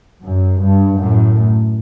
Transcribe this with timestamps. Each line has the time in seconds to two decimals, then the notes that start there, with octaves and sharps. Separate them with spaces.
0.22 F#2
0.61 G2
0.98 F#2 A2